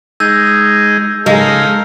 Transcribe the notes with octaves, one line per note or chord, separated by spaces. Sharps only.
G#3 D#4 G#4 E6 G6 A6
C#3 G#3 D#4 A4 A#4 F5